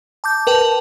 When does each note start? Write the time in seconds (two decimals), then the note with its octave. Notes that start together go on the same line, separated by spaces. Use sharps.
0.24 A5 D6 G6
0.47 A#4 B4 G5 A5